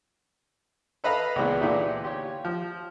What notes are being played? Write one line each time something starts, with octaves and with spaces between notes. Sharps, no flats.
A4 B4 D#5 F5 A#5 B5
C#2 A#2 E3 G#3 B3 C4
A#2 D3 E3 D#4 E4 G4
F4 G4 C#5
F3